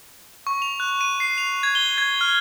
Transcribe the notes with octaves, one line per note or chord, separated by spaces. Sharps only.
C#6
F7
F#6
D#7
C7
F7
G#6
G7
G#6
F6